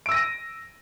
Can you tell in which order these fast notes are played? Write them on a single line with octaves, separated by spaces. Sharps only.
D7 E6 A#6 D#7